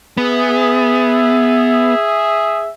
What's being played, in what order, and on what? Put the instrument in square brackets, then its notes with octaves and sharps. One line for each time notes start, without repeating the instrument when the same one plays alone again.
[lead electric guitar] B3 [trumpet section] G#4 E5